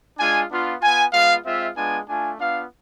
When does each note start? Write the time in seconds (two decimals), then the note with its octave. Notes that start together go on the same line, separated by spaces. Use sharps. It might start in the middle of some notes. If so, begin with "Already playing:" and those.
0.18 G#3 D4 F4 G#5
0.50 B3 D4 F4
0.81 B3 F4 G#5
1.12 G#3 B3 F4 F5
1.45 G#3 C4 F4 E5
1.76 G#3 B3 D4 F4 G#5
2.07 A3 D4 F4 G#5
2.38 B3 D4 F4 F5